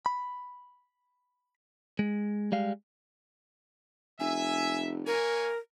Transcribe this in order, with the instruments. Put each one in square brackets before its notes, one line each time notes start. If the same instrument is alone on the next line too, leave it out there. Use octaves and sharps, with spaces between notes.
[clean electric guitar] B5
G#3
G3 G#3 F5
[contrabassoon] F1 [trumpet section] E5 [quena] G#5
[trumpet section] A#3 C#5 G#5 [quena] A#4